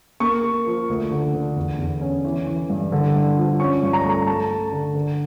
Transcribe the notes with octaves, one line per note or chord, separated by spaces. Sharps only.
A#3 C#6
A#3
F3
D2
D3
D3
E2
E2
C#4
E3
E3
G2
D3
G2
F3
C#4 C#6
G2
A#5
C#6
A3 A#5
A3 A5
A3
D3
D3